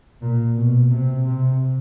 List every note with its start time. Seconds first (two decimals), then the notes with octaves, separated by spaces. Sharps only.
0.21 A#2
0.56 B2
0.91 C3
1.25 C3